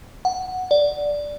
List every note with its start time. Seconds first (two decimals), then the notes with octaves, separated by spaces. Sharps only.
0.25 F#5
0.71 D5